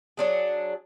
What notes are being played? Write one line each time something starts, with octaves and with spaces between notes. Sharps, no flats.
F#3 D4 G#4